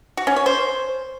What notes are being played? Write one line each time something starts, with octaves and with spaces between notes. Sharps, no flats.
F#4
C#4
C#5
C5